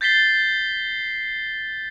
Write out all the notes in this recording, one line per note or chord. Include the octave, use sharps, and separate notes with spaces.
G6 A6 B6 C7 G7